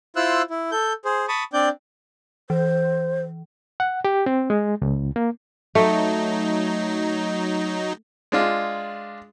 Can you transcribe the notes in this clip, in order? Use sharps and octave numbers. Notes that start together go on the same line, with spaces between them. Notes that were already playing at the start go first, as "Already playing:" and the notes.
E4 F4 C5 E6 F#6
E4
A4 G6
G#4 C5
A5 B5 C#6 D#6
C4 D4 D5 G6
E3 C5
F#5
G4
C4
G#3
C#2
A#3
F#3 A3 D#4
G#3 D4 F4